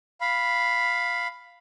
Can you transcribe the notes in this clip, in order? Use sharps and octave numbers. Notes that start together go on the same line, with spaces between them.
F5 B5